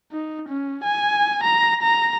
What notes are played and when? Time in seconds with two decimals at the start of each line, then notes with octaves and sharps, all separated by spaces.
0.12 D#4
0.49 C#4
0.84 G#5
1.44 A#5
1.82 A#5